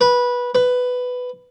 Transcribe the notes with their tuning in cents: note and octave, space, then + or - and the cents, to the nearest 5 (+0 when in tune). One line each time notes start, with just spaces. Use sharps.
B4 -15
B4 +10